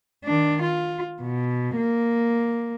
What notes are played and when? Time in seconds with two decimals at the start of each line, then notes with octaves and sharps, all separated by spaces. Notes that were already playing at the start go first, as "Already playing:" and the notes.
0.25 D#3 D4
0.62 F4
1.22 B2
1.76 A#3